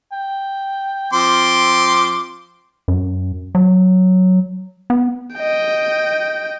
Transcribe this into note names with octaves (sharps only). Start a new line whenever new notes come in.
G5
F3 C4 C6 D6
F#2
F#3
B3
D#5 G5